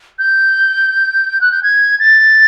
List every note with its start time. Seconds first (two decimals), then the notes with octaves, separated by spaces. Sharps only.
0.19 G6
1.41 F#6
1.52 G6
1.63 G#6
1.99 A6